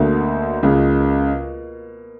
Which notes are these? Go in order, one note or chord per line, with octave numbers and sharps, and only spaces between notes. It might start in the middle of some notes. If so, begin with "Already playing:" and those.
Already playing: D2 B2 D3 A#3
C#2 C#3